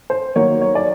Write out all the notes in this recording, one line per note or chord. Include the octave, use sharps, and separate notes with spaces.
C5
D#3 F#3 A#3 C#5
C#5
D5